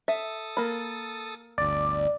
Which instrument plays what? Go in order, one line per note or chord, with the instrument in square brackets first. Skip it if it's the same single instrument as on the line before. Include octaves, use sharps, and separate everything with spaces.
[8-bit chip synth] A4 D#6 A6 [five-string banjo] E5
[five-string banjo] A#3 B5
[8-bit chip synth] G1 D2 [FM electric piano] D5